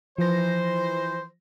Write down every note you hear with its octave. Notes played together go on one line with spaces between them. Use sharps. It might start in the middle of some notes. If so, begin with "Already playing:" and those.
E3 F3 C5 A#6